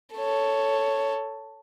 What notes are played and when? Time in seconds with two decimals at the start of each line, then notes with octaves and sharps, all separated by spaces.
0.14 A4 C#5